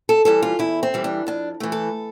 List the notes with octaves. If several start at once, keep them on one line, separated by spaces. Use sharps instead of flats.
A4
E3 G3 A4
F4
E2 E4
C4
E3 G3
D4
F2 D4
E3 A3
A4